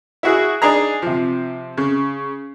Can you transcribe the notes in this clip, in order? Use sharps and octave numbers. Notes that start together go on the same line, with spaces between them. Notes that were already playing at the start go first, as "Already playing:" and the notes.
E4 F#4 G#4
D4 D#4 G#4 A#5
C3 F3
C#3